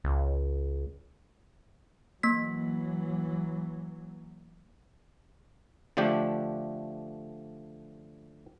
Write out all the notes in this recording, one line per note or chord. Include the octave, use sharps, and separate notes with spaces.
C#2
E3 F#3 A#3 B6
D3 F3 A3 D4 G4